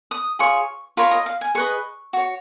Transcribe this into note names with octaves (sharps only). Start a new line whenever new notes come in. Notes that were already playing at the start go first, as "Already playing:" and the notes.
D#6
F4 G#4 C#5 C#6
F4 A#4 C#5 B5
D#5
F5
G#5
G#4 B4 D#5 C#6
F#4 C#5